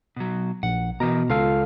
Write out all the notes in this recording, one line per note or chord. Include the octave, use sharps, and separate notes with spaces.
B2 F#3
A#1 F#5
B2 E3 A#4 A#5
C#2 F4 A4 F5